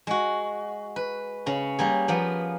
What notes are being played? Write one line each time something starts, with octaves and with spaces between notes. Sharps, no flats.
G#3 F#4
B4
C#3 C#4
G3 A#3 G#4
F3 A#3 B3